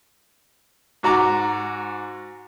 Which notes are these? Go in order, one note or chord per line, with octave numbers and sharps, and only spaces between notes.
G#2 F#4 A#5 D6